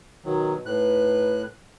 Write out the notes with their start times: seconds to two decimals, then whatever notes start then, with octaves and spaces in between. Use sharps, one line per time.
0.25 B2 D#3 F#3
0.66 A2 D#4 B4 F#6